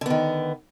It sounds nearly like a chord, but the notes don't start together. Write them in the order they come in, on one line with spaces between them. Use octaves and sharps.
D3 B3 D#3